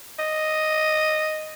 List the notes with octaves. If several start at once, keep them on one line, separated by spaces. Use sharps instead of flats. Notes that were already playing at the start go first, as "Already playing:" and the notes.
D#5